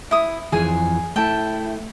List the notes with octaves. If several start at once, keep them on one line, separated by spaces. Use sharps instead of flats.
E4 D#6
F2 E3 F3 G#4 G#5
A3 E4 G5 A5